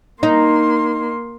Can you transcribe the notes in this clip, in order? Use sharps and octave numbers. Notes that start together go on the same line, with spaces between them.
A#3 D#4 C6